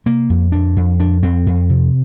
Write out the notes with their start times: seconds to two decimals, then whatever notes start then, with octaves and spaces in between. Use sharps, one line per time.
0.06 C3 A#3
0.30 F2
0.52 F2 D4
0.76 F2
0.99 F2 D4
1.23 F2 C4
1.46 F2
1.69 C3